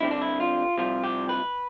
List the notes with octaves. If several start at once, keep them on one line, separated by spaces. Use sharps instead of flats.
G2 D3 G3 C4 E4
D4
E4
F4
C2 C3 F3 F4
G4
B4